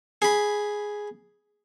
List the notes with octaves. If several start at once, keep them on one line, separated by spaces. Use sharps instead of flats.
G#4 B5